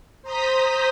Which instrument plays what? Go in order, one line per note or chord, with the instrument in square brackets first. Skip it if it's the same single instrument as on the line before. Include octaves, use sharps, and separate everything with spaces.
[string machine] C5 A#5 D#6 G6 B6